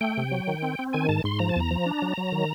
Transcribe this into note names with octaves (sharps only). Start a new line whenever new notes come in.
A3 G5
C3
F#3
D#3
C4
C4
D#3 G#5
G#2 A5
G#2 C6
F3 A#5
A5
E2 A#5
F3
D4
F#3
F#3
D#3